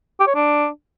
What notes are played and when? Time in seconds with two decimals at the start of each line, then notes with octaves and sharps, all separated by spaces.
0.20 G4
0.27 C#5
0.35 D4